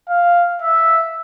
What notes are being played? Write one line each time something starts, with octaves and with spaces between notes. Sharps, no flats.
F5
E5